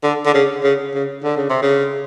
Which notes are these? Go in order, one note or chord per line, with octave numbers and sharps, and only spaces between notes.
D3
D3
C#3
C#3
C#3
D3
C#3
C3
C#3